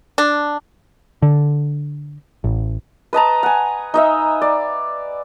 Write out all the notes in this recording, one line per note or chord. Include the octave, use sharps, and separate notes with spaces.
D4
D3
A1
B4 D#5 A5 A#5
F#5 G#5
D#4 D#5 E5
D5